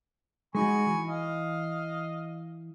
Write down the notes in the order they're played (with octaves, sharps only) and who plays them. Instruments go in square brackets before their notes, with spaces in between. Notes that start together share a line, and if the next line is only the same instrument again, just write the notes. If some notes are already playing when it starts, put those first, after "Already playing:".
[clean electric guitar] G#3 D#4 F#4 [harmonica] G#5 B5 C#6
[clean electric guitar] E3
[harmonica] D#5 F5